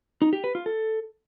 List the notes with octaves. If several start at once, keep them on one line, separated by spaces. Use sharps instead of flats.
D#4
G4
B4
F4
A4